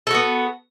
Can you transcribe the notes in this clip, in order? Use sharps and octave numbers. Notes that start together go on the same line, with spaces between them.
B3 F#4 A4